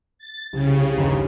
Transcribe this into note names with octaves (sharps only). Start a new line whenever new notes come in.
A6
C2 C#3 G#6
G1 D#2 D#3